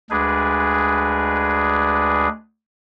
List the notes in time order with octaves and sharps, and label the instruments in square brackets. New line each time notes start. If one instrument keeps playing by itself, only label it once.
[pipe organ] D2 G#3 D4 G#4 B4